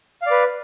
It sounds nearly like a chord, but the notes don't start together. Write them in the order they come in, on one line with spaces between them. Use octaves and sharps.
F5 D5 B4